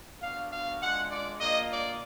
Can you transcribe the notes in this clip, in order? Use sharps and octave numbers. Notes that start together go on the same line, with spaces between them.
B3 D4 F#4 F5
F5
G#3 D4 F4 F#5
D5
A#3 D4 F4 D#5
D5